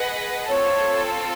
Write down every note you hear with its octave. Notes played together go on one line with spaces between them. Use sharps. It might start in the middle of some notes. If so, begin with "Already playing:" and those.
Already playing: G#4 B4 D#5 F#5
C4 F4 A4 C#5